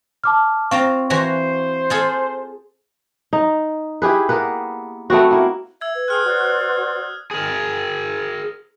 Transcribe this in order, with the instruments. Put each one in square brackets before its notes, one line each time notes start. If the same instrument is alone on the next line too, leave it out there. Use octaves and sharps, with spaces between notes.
[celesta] A5 D6 F6
[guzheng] C4 F4 A#5 [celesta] F5 C#6
[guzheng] E3 F#4 A#5 [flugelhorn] C5
[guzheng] F4 G#4 A4
[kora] D#4
E4 G4 G#4 B4
A#3 B3 B4
A3 B3 C4 F#4
A#3 E4
[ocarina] E5 [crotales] E6 G#6
[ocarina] B4
[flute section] G#4 G5 C6 [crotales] D#6 F6 F#6
[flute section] F#4 C5 D5
[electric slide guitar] G#4 A#4